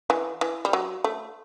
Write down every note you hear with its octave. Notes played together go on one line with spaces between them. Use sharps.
E3
E3
G3
F#3
A3